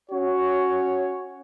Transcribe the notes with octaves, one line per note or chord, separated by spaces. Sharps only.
C#4 F#4 C#5